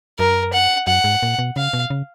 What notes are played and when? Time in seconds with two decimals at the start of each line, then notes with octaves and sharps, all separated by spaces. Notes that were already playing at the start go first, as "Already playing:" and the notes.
0.19 F#2 A#4
0.53 F#5
0.87 F#2 F#5
1.04 G#2
1.23 A#2
1.39 B2
1.56 C#3 F5
1.73 B2
1.90 C#3